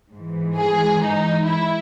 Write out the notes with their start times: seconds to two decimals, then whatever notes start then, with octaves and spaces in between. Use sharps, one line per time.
0.12 G#2 E3
0.57 G#4
1.01 D#4
1.46 E4